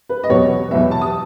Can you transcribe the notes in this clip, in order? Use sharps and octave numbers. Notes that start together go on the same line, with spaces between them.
B4
D#5
E2 B2 F#3 B3 C#5
E2 B2 F#3 B3 E5
A5
D#6